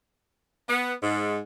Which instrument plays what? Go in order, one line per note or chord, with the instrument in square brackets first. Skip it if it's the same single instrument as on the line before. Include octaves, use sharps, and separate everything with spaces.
[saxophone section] B3
G#2